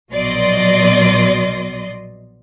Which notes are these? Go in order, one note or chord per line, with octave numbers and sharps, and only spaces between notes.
A#1 B2 F#3 D5 D#5 C6